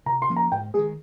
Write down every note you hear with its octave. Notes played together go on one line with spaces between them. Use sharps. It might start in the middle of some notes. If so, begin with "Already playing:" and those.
C3 A#5
C6
F3 A#3 C#4
A#5
G#2 G5
D#3 G#3 G#4